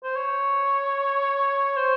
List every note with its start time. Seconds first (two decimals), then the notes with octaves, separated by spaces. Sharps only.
0.04 C5
0.16 C#5
1.77 C5